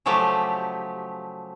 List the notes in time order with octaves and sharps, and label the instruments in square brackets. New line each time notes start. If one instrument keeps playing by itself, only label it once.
[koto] C#3 F3 F#3 A3 G4